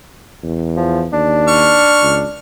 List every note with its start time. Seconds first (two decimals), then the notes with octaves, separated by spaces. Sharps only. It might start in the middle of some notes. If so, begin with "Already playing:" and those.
0.43 E2
0.77 F3
1.13 D#2 D4
1.48 C#6 F6
2.03 C#2